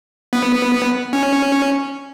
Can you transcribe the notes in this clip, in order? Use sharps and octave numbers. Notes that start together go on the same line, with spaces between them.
B3
C#4